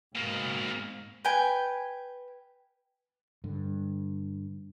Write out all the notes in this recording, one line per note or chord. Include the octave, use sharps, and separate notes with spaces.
G#2 B2 A#3
B4 G5 G#5
G2 D3